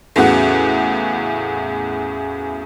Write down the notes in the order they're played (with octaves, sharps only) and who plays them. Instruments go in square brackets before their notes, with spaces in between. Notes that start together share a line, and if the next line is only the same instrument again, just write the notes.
[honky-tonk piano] E2 A2 C#3 F#4 F#5